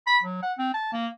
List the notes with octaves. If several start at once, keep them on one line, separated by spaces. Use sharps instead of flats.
B5
F#3
F#5
C4
A5
A#3